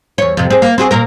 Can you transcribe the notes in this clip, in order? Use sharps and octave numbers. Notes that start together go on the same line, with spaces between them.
E2 C#5
F2 C3
C4 G#4
A#3
C4 F#4 G#4
A#2 A#3 A#4